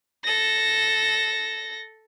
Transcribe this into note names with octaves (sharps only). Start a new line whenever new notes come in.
A4 A#6